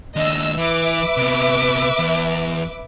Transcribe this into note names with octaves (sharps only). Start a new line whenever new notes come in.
D#2 D4 D#5 E6
E3 B4 E5 D6
C3 B3
E2